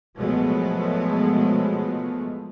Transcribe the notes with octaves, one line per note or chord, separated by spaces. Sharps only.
B2 F3 F#3 G#3 A3 B3